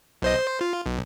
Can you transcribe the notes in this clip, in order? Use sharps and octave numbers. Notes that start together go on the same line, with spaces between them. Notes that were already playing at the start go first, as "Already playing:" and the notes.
B1 C5 D#5
C5
F4
B1